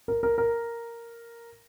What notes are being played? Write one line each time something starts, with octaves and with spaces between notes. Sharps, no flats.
A#4
A#4
A#4